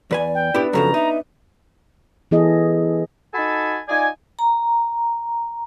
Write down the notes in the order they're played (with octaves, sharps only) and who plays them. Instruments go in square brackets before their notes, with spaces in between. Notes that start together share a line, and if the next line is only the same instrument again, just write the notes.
[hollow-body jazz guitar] E2 B4 G#5 [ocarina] D5
[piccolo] G5
[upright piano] B3 D4 B4 [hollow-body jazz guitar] E4 G4
[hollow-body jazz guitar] F#2 C#3 F3 [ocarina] A4 [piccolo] A#5
[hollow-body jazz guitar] D#4 [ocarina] E5
[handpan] E3 B3 E4 G#4 A4 D#5
[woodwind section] D#4 F#4 A4 G#5 A5 B5
D#4 F4 D5 G#5
[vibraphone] A#5